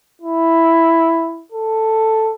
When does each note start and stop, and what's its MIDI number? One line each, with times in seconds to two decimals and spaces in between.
0.22 1.44 64
1.52 2.33 69